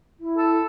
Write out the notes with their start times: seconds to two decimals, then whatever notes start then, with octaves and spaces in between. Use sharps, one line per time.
0.20 E4
0.38 A4